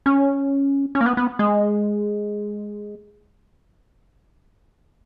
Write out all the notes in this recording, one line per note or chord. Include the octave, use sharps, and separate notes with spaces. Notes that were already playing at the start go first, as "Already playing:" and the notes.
C#4
C#4
A#3
B3
B3
G#3